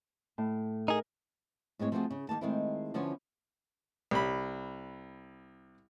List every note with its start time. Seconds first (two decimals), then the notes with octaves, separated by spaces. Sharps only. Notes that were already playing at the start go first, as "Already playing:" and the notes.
0.38 A2
0.88 D#4 G#4 A#4
1.79 A2 G#3 C4 C#5
1.92 F3 A3 B3 C4 F#4 G#4
2.10 C#3
2.29 D#3 F#3 A#3 A5
2.41 D#3 G#3 A3 C4 E4
2.94 D3 F3 B3 C#4 E4 C#5
4.11 C2 B5